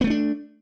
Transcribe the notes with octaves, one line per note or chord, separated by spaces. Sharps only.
A3 B3 C4 D4